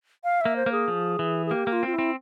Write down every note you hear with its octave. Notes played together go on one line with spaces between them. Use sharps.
F5
A#3 E5
C5
A#3
G#4
F3
E3
G#4
A#3 G4
A#3
F4
C4 F4
E4
C4